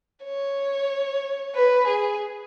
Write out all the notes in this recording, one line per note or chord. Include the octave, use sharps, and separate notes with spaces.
C#5
B4
G#4